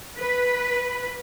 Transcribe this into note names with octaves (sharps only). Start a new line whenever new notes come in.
B4